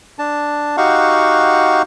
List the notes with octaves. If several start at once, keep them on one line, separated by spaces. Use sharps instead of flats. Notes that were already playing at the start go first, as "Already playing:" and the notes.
D4 A5
D#4 F#4 G4 F5 F#5 C#6